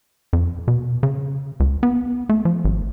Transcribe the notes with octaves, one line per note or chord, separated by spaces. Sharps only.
F2
B2
C#3
C#2
B3
A3
F3
G#1